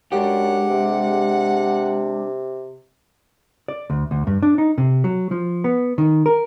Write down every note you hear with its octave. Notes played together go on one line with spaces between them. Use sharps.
F#2 G#3 D4 G4 F#5
C3
D5
D2
D2
G2
D4
D#4
C3
F#3
F3
B3
D#3
A#4